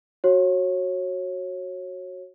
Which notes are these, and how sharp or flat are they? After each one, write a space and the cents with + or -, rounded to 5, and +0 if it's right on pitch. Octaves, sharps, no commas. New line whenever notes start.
F#4 +0 C#5 -25